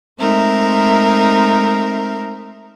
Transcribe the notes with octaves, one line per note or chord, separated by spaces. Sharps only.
G#3 A3 C4 D#4 A#4 E5